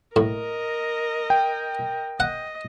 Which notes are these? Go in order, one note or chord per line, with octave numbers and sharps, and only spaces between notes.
A2 A#4 D#5
G5
D#5 F#5